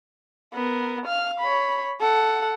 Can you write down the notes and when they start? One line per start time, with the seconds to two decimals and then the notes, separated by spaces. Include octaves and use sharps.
0.54 B3 A#4
1.06 F5 F6
1.40 C#5 B5
2.00 A4 F#5